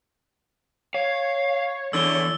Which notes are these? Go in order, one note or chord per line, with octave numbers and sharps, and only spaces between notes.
C#5 F5
E2 D3 E6 G7